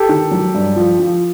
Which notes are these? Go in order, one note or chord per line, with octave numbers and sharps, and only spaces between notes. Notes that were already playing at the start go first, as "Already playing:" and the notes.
Already playing: G4 A4
D#3
F#3
G2
F3
F3